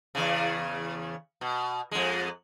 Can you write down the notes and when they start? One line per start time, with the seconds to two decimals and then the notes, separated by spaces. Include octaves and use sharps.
0.15 E2 C#3
1.41 B2
1.91 F2 G#3